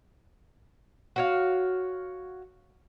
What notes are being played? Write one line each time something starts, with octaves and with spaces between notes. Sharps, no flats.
F#4 C#5 F5